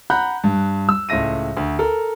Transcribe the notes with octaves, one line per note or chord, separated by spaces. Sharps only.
F#5 A#5 B5 F#6 G6
G2
E6
C#2 A2 E5 A#6 D#7
D2
A4 A#4